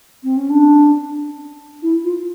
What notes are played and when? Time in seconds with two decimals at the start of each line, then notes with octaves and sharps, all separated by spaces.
0.24 C4
0.37 C#4
0.50 D4
1.83 E4
2.04 F4